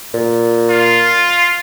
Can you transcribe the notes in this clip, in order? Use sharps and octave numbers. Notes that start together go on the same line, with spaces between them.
A#2
F4